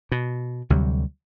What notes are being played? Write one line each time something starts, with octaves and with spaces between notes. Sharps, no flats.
B2
D2 C3 F#3 G3